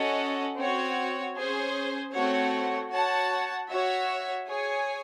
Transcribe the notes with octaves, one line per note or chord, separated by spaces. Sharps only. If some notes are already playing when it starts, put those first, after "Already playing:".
Already playing: C#4 F#4 A4 D#5 F#5
C4 F#4 C#5
C#4 G#4 C5
A3 C4 F#4 C#5 F#5
F#4 C#5 F#5 A5
F#4 C#5 E5
G#4 C#5 G#5